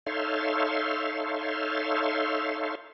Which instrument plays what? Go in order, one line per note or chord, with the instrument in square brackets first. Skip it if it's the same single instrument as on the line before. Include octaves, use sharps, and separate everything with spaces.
[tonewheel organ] D#4 A4 C#5 E5 F5 C6